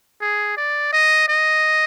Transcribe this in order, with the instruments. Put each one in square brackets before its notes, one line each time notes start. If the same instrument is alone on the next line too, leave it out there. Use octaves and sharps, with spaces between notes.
[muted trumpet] G#4
D5
D#5
D#5